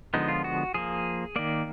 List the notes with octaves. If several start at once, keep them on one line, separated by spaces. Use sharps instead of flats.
D3 F3 G#3 B3 D#4
F4
F#4
F3 A#3 G#4
D#3 A#3 D5